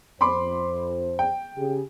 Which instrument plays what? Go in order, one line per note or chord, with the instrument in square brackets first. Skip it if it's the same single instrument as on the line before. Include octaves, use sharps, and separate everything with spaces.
[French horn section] F2 C5 [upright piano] B5 C6 D6
[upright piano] G5
[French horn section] C#3 G4 G#4